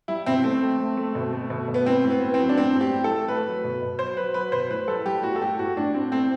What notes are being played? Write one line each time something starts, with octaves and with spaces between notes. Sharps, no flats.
G3 E4
B2 C4
A3 C4
A3
A3
A3
B2
A3
B2
B2
B3
A2 C4
A2
B3
A2
C4
F#3
D4
A2 C4
A2
G4
A2
A4
A3
A3 B4
F#3
B2
B2
F#3 C5
F#3 B4
F#3 B4
B2 C5
A2 B4
G3 A4
G3 G4
A2 F#4
A4
A2 G4
A2 F#4
A2 D4
A2 C4
A3 C4